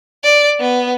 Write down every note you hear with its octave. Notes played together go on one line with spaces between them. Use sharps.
D5
B3